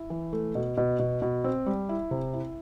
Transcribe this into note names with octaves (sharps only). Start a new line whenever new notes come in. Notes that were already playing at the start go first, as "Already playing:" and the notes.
Already playing: E4
E3
A3
B2
B2
B2
B2
C4
G3
E4
C3
E4